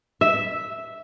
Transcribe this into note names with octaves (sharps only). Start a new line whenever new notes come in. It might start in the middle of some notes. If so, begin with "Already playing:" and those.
E5